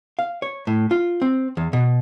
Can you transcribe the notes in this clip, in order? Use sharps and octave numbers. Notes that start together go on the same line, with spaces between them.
F5
C#5
A2
F4
C4
E2
B2